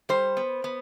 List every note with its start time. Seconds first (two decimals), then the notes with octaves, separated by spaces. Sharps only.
0.09 G3 C5
0.37 B3
0.64 B3